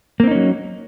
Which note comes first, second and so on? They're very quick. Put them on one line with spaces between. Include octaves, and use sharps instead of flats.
A#3 C4 D#4 C#4 F#3